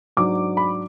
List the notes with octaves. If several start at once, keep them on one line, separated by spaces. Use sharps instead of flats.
G#2 F#3 D4 D6
B5